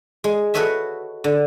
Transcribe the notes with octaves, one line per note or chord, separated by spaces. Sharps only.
G#3
F#4 A4 B4 C#5 D#5 E5
D3